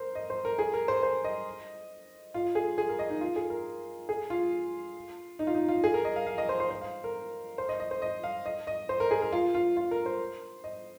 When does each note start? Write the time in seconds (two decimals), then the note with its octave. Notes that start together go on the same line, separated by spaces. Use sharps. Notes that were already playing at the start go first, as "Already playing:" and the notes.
Already playing: A#4 C5
0.15 D#5
0.30 C5
0.45 A#4
0.59 G#4
0.74 A#4
0.88 C5
1.03 C5
1.25 D#5
2.34 F4
2.55 G#4
2.78 G#4
2.89 A#4
2.99 D#5
3.10 D#4
3.21 F4
3.36 G#4
3.50 A#4
4.09 G#4
4.30 F4
5.39 D#4
5.47 F4
5.54 D#4
5.68 F4
5.84 G#4
5.94 A#4
6.05 D#5
6.16 F5
6.26 F5
6.38 D#5
6.49 C5
6.60 C5
6.70 C5
6.81 F5
7.04 A#4
7.58 C5
7.69 D#5
7.80 D#5
7.91 C5
8.02 D#5
8.24 F5
8.46 D#5
8.67 D#5
8.89 C5
9.00 A#4
9.11 G#4
9.22 A#4
9.32 F4
9.55 F4
9.77 F4
9.91 A#4
10.06 C5
10.64 D#5